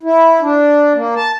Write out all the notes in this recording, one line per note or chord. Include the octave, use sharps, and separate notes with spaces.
E4
D4
A#3
A5